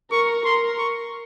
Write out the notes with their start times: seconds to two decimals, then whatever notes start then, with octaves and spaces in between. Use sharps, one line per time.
0.11 A#4 C#6
0.45 A#4 C6
0.78 C#6